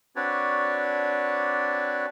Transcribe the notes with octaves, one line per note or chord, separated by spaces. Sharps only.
C4 D4 F#4 B4 C#5 D5